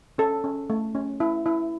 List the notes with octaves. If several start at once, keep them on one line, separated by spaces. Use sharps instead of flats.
C#4 A4
C#4
A3
C#4
E4
E4